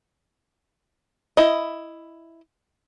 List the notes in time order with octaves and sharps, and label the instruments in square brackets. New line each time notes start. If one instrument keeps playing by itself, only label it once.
[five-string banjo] E4 D#5